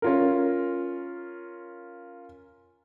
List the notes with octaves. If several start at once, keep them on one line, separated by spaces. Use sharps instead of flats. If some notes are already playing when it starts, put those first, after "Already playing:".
C#4 F4 A#4